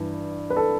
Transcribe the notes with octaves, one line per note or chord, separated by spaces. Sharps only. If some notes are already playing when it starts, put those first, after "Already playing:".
Already playing: G2 E3
B4
A4